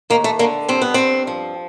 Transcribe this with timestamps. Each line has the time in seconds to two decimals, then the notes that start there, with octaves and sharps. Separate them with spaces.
0.10 D#2 A#3
0.24 A3
0.39 D3 A#3
0.69 G2 C4
0.82 B3
0.94 G2 C4
1.27 F3